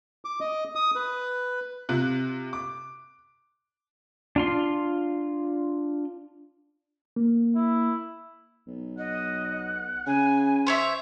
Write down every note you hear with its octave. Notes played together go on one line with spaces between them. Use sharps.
D6
D#5
D#6
B4
C3 F4 F#6
D6
D4 F4 C6
A#3
E4
B1
D#5 F#5
C#3 G#5
C5 C#5 E5